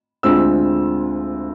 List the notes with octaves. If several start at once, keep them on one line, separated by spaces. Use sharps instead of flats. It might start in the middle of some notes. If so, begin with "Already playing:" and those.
D2 D3 G#3 C4 F4 E6